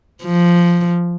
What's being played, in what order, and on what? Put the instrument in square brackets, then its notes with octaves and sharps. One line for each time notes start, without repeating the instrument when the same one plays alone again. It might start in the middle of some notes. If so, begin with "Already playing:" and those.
[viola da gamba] F3